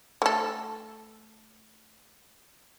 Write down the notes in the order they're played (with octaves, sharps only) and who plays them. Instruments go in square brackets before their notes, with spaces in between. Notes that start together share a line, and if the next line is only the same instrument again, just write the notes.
[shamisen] A3 A4